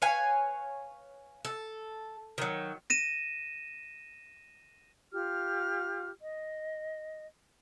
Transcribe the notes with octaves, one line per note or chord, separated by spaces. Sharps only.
B4 C#5 F5 G#5
A4
D#3 F#3
A#6 D#7 E7
F4 G4 F6
D#5